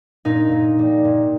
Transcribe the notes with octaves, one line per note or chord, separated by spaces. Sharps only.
A#2 D#4
A#2
G3
A#2